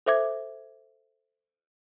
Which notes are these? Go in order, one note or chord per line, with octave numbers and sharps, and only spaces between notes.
A4 C5 E5 D6 G#6